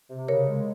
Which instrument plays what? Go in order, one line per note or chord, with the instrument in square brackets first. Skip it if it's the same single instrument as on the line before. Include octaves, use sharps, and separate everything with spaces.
[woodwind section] C3
[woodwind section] C#3 [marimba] A#4 C#5
[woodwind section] G#3